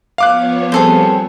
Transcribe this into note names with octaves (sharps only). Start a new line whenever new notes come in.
F3 B3 C#5 F5 D6 F#6
G3 C4 G#4 A4 C5